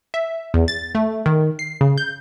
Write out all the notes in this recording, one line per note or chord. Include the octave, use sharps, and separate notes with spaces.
E5
E2
A6
A3
D#3
C7
C#3
G6